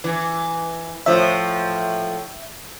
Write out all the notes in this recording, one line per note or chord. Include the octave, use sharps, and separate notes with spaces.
E3
A2 F3 E5